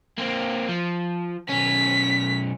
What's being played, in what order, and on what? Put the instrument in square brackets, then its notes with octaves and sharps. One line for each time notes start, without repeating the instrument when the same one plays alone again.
[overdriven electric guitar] A#3 C4
F3
[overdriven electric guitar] B1 C#4 [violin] B6